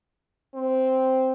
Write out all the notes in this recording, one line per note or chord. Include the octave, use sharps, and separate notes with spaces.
C4